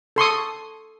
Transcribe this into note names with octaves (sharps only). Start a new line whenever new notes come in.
A4 C6 C#6 D#6